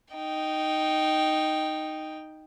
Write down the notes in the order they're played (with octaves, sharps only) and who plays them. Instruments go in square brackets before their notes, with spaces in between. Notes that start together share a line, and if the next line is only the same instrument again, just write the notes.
[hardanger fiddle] D#4 G5